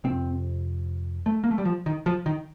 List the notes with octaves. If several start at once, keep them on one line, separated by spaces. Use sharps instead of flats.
F2 C3 C4
A3
A#3
A3
G3
F3
D#3
F3
D#3